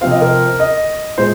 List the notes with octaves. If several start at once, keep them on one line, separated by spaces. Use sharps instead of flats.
C3 F3 C4 F5
D#5
A#4
D#5
A#2 G#3 C5